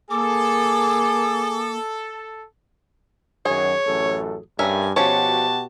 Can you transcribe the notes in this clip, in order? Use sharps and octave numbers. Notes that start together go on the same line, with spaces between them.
A#3 G#4 A4 D6
F#2 D#3 F#3 G#4 C#5
A1 F#2 A4
G2 C#4 A#4 E5 G#5
B2 F3 C#4 F#4 G4 C#5 A5